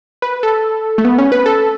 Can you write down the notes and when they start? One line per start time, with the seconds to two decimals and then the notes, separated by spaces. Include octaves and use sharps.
0.22 B4
0.43 A4
0.98 A3
1.05 B3
1.18 C#4
1.32 B4
1.46 A4